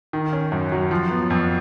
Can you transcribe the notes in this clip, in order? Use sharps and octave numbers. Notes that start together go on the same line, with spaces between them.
D#3
C#4
F#2
F#3
F3
B3
F2